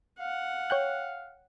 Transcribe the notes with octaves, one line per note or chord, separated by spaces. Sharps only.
F5 F#5
C#5 G5 F#6